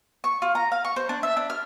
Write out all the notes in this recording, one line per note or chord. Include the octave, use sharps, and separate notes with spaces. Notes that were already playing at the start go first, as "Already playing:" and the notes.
C#6
F4
A#5
F5
C#6
C5
D4
E5
D4
F6